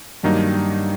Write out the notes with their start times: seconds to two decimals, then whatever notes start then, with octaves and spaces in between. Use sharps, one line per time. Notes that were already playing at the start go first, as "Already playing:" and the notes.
0.23 G2 D#3 F#3 A#3 D#4